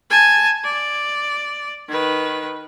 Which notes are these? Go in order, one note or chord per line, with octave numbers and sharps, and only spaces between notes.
G#5 A5
D5
D#3 B4